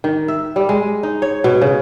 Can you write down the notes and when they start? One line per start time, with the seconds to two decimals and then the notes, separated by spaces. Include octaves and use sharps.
0.04 D#3
0.28 E5
0.56 G3
0.69 G#3
1.03 D#4
1.22 C#5
1.44 B2
1.61 C#3